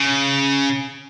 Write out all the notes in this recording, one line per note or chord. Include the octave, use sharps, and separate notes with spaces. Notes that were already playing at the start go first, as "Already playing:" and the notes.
Already playing: C#3